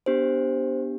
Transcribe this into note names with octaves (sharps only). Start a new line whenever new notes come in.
B3 D4 G4 C5